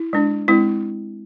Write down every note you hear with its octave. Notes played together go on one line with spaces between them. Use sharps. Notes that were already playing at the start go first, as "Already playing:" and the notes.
Already playing: E4
G#3 D4
G#3 C4 E4